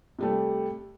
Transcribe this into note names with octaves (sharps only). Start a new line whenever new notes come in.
C3 G3 A3